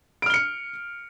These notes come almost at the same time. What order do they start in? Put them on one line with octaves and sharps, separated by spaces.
D7 F6 G7 C#7